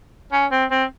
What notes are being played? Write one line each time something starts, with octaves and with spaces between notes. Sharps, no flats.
C#4
C4
C4